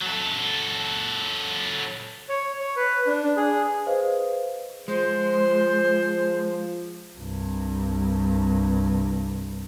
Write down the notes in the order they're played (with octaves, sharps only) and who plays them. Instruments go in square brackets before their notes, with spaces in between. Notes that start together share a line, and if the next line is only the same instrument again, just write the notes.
[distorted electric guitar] F#3 A4
[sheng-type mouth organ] C#5
C#5
B4
D4
D4
G#4
[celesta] G#4 B4 C5 D#5 F5
[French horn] F3 [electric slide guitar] G#3 [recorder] C5
[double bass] C2 G2